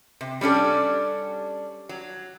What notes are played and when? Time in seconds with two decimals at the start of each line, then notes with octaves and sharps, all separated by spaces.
0.21 C3
0.41 G3 C#4 D4 A4
1.89 F#3